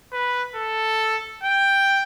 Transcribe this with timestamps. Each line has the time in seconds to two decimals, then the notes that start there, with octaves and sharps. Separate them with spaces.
0.13 B4
0.56 A4
1.44 G5